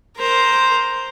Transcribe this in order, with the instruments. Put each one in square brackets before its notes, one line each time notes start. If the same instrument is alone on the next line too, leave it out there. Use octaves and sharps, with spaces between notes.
[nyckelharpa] A#4 C5